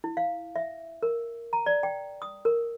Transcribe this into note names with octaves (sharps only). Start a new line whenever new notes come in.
E4
F5
E5
A#4
A#5
D5
G5
D#6
A#4